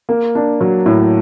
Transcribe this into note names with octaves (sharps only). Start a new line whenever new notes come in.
A#3
D4
F#3
A2